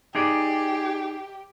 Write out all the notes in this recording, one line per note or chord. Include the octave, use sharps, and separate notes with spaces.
D#4 G4 G#4 D5